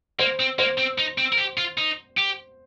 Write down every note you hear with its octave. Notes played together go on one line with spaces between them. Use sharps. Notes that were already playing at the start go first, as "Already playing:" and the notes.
A#3 C5
C4
A#3 C5
C4
D#4
C4
A#4
G4
F4
D#4
G4